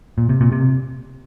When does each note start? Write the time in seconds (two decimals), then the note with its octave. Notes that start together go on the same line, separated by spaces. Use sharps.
0.18 A#2
0.29 C3
0.41 A#2
0.52 C3